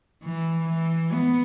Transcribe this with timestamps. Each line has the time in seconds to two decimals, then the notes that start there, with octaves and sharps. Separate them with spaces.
0.23 E3
0.69 E3
1.13 B3